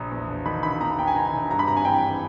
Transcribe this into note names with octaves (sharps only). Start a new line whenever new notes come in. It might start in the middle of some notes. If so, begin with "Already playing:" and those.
Already playing: A#1 A#5
E2
E1
D#3 B5
E1 B5
E2 A#5
E1 G5
G#5
D#3 A#5
E1
G2 A#5
B5
G#1 A#5
G#5
E3 G5